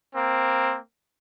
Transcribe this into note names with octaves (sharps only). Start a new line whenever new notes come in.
A#3 C4